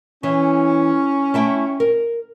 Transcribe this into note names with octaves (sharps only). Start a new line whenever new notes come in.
E3 C#4
A3 E4 G5
A#4